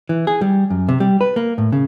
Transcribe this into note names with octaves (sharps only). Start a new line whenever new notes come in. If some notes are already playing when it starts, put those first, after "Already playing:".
E3
G#4
G3
F#2
C3
G3
B4
A#3
A2
C#3